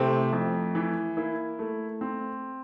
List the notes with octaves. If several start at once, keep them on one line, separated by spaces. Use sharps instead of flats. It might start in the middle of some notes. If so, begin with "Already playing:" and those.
Already playing: C3 E3 A3 C4
F2
E3
A#3 E4
A3
C4